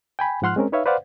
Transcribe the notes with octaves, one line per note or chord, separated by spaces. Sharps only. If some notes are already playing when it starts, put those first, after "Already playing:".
G5 G#5 B5
G#2 F3 F#5 C6 F6 F#6
G#3 C4 C#4 A#4
D#4 B4 C#5 E5 F5
B4 C5 D5 F5 F#5